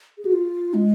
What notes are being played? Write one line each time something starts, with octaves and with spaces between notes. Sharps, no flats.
G#4
F#4
F4
G#3